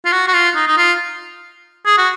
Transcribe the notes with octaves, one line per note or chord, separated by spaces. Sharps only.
F4
F#4
F#4
F4
D#4
D#4
F4
G#4
F#4